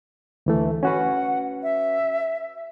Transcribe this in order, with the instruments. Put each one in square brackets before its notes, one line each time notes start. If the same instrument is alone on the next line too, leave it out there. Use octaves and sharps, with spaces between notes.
[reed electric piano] D2 E3 A3
[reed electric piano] C#4 F#4 B4 [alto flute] F#5
[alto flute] E5